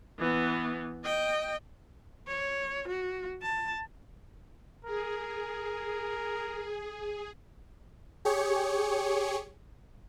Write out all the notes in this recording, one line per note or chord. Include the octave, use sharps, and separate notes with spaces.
E3 B3
D#5 G5
C#5
F#4
A5
G#4 A#4
G4 G#4 C#5 C#7